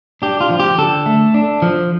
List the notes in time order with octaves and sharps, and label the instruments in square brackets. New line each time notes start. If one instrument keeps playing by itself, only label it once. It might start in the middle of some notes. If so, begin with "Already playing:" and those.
[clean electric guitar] D4 G4
F4
F3
G4
D3 A4
A3
D4
F3